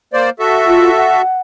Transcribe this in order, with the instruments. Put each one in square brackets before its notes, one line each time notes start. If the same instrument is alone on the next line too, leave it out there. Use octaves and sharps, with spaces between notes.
[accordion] A#3 C5 D5
F#4 A4 E5
[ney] F4
F#5